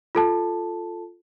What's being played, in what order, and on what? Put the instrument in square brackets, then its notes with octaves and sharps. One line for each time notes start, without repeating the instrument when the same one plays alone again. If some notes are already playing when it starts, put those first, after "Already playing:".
[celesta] F4 A4 A5